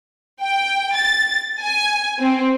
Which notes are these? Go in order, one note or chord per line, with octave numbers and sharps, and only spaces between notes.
G5
A6
G#5
C4